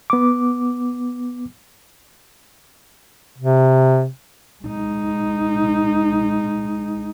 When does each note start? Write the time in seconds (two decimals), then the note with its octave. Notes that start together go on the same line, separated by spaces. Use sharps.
0.10 B3 D6
3.38 C3
4.63 G#3 D#4